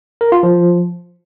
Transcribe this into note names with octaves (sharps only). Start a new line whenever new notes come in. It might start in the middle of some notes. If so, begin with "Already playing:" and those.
A#4
F4
F3